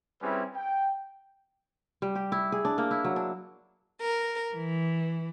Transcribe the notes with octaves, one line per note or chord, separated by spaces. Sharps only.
G3 C4 C#4 E4 G#4 B4
G5
G3
G4
E4
G#4
D4
A#3
E4
F#3
D4
A#4
E3